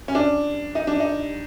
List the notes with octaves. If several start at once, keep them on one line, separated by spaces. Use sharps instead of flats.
C#4
D4
D#4
D4
D#4